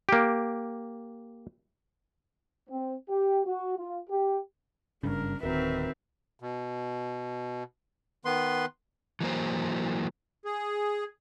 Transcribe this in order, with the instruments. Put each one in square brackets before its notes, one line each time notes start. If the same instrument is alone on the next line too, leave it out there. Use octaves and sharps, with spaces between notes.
[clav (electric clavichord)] A#3 G4
[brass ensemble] C4
G4
F#4
F4
G4
[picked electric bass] F#1 G2 C#3 [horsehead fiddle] D4 A#4
[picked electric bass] D1 [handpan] D#3 F#4 A#4 [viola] C4 [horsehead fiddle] B4 E5
[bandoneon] B2
D#3 B3 B4 C6
[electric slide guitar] E3 F#3 A#3 C5
[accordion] G#4